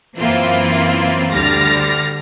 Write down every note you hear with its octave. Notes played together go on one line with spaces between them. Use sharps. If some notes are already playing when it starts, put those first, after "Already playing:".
F#2 E3 A#3 C4 E4 F4
D2 D3 G3 F6 A6 A#6